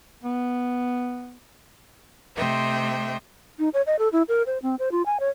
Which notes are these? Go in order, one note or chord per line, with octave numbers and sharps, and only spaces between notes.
B3
C3 A3 C5 D#5 E5 G5
D#4
C#5
D#5
A4
E4
A#4
C5
C4
C5
F4
G#5
C#5